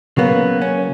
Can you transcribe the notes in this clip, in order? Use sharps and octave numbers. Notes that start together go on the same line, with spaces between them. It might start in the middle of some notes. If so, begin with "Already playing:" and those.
C#3 F#3 A#3 B3
C#4